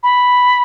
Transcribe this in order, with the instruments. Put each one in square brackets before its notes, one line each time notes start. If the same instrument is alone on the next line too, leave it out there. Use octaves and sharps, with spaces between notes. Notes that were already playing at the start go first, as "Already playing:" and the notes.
[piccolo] B5